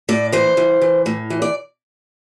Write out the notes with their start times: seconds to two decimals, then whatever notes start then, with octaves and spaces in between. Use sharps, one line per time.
0.09 A2 D5
0.32 E3 C5
0.57 E3
0.82 E3
1.06 A2
1.30 E3
1.42 D5